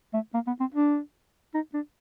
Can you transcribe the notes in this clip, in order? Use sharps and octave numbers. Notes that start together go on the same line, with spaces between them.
A3
A#3
B3
C4
D4
D#4
D4